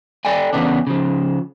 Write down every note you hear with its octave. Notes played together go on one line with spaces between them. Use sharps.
A4 D5 G5 G#5
E2 G2 C#3 B3 C#4 D4
C#3 F3